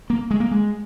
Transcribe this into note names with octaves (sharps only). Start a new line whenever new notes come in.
A#3
G#3
A#3
G#3